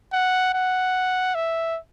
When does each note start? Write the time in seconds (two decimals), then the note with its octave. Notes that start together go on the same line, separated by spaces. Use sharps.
0.13 F#5
0.54 F#5
1.35 E5